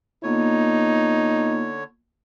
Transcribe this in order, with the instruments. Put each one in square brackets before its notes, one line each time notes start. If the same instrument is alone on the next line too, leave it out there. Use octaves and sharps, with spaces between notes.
[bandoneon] D3 C#5 [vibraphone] A#3 B3 F4 [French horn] D#4